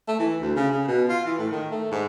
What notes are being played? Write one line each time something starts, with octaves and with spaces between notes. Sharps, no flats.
A3
E3
D2
C#3
C#3
B2
F4
E3
A2
D#3
A3
G#2